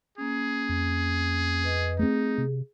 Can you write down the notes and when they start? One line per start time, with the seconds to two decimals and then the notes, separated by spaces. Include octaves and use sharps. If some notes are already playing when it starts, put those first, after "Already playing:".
0.18 A#3 C#4 G#4
0.69 F2
1.64 B4 D#5
1.99 A3 C4 D#4 G#4
2.38 C3